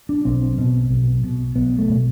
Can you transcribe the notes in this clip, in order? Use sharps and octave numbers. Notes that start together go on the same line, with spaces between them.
D4
B1 C4
B2
B1
B2
B1 B3
A3
B2